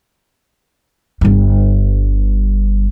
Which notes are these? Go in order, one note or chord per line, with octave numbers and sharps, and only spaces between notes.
G1 G2